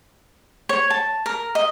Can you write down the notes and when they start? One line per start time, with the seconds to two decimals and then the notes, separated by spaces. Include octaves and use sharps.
0.69 C#5
0.90 A5
1.26 A#4
1.55 D#5